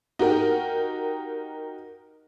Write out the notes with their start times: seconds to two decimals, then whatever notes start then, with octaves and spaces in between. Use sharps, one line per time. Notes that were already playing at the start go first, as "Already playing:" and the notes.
0.19 D#4 F#4 G4 A#4